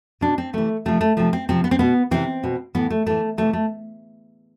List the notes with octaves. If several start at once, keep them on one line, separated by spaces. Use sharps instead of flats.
B2 D4
C4
C3 E3 A3
C3 F3 A3
A3
C3 F3 A3
C4
C3 F3 C4
B3
C4
B2 B3
C3 E3 C4
B2
A2 E3 B3
A3
A2 E3 A3
C3 E3 A3
A3